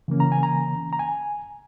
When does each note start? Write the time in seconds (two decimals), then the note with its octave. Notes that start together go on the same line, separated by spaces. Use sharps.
0.08 C#3 E3 A#3 C#4
0.20 A#5
0.32 G#5
0.43 A#5
0.93 A#5
0.99 G#5